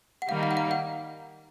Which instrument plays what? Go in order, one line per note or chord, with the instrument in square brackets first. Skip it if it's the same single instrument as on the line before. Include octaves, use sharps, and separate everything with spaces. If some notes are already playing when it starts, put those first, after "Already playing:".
[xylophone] F#5
[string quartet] D#3 G3 A#3 D#4 [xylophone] F5
[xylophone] F5
F#5
F5
F#5